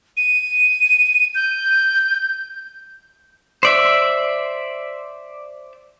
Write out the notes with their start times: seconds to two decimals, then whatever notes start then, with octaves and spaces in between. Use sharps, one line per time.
0.17 D#7
1.35 G6
3.63 C5 D5 E5